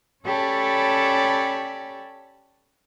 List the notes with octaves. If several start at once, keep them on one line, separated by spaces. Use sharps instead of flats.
C#4 G4 A4 C#5 D5 B5